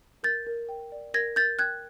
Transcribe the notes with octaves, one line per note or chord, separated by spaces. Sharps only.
A#4 G6 A6
A#4
G5
D5
A#4 G#6 A#6
A#4 G6 A6
G5 F#6 G#6